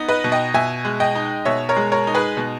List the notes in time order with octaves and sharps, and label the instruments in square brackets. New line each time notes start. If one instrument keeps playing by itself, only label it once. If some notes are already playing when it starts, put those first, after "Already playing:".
Already playing: [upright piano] B3 D#4
B4 D#5
B2
D#5 G5
B2 E5 G#5
G#3
D#5 G5
D#4
B2 C#5 E5
A#4 C#5
G#3
A#4 C#5
D#4
G#4 B4
B2